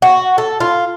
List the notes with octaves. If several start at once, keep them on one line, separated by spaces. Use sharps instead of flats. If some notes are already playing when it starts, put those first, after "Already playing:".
F#4
A4
F4